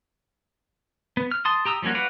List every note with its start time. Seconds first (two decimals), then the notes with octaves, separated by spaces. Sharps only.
1.17 B3
1.31 F6
1.45 A5 C6 D#6
1.65 G4 A#5 D#6 E6
1.82 F3 G3 A#3 C#4 F#4
1.95 F#4 B4 D5 F5 F#5